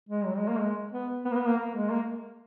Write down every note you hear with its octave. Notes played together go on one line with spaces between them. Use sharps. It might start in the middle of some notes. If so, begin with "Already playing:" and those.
G#3
F#3
G#3
A#3
G#3
B3
B3
A#3
B3
A#3
A#3
G#3
A#3